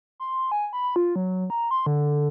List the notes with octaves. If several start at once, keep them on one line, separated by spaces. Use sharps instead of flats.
C6
G#5
B5
F4
F#3
A#5
C6
D3